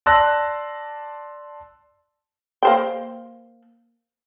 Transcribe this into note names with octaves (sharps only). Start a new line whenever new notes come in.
D5 A5 C6 E6 F#6 A#6
A#3 C5 G5